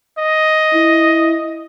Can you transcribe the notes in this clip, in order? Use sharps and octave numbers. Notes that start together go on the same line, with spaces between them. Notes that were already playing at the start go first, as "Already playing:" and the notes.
D#5
E4